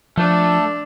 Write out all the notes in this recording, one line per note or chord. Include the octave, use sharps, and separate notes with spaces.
F3 A3 D4